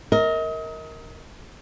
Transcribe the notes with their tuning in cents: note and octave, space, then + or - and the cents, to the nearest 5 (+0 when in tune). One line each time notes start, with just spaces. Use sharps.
A#4 -5 D#5 +35